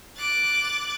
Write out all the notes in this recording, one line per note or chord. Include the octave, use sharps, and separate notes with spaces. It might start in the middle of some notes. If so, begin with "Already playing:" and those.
D6 F#6 A6